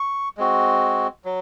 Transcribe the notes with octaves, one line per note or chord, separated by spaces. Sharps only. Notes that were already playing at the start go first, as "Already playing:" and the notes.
Already playing: C#6
G#3 C4 F#4
F#3